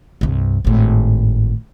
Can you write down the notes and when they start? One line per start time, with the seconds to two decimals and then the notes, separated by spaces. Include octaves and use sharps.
0.21 C2 G2
0.65 G#1 A2